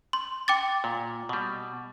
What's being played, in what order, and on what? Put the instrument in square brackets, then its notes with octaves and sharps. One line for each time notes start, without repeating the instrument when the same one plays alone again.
[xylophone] C6
G5 D6 A6
[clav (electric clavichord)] A#2
B2 G3